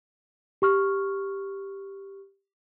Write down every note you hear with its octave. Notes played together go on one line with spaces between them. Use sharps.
G4 C#6 F6